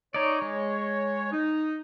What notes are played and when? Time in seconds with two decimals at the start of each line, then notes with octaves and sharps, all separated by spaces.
0.14 D#4 C#5 D5
0.42 G#3
1.31 D#4